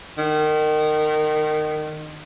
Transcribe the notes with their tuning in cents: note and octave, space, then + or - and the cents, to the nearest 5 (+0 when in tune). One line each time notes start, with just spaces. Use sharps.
D#3 -25